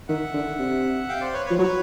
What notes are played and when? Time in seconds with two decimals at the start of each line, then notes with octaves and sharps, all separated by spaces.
0.08 D#3 E5 F#5
0.34 D3
0.59 C3
1.09 F5 G5
1.21 C5 D5
1.34 B4 C#5
1.46 B4 C#5
1.50 F3
1.58 F#3 B4 C#5